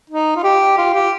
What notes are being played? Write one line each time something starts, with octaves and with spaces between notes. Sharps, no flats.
D#4
F4
G4
F4
G4